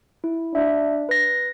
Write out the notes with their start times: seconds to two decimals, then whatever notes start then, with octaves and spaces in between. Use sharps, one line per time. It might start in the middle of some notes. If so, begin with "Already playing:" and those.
0.24 E4
0.55 D4 E5
1.09 B4 A#6